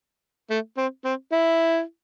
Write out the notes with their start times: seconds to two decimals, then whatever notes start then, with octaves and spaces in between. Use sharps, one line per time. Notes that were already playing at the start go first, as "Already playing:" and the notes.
0.50 A3
0.77 C4
1.05 C4
1.32 E4